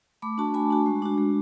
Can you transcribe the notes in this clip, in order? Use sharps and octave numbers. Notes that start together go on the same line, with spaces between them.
A3 B5 D6
D4 F#4 A5 C#6
A3 G#5 B5
D4 F#4
G#3
D4 F#4
G#3